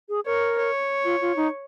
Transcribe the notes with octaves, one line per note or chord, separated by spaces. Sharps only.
G#4
A#4 C#5
C#5
F4
F4
D#4